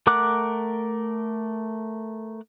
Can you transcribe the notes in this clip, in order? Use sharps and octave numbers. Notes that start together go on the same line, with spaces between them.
A3 A#4 F#5 D6 F#6